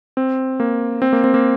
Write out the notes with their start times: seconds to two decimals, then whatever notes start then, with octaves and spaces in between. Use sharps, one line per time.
0.17 C4
0.60 A#3
1.02 C4
1.13 A#3
1.24 C4
1.34 A#3